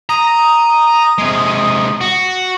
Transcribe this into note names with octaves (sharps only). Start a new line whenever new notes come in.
A#5 D#6
C3 G#3
F#4